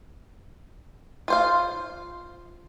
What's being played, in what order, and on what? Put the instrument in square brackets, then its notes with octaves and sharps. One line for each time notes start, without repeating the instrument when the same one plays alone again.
[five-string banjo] F4 C5 F5